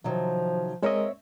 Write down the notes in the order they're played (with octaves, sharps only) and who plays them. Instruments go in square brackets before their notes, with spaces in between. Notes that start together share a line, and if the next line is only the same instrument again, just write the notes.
[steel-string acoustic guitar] C3 D#3 F#3 [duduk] F3
[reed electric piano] G#3 A#4 D#5 [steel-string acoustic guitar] C4 C#5 E5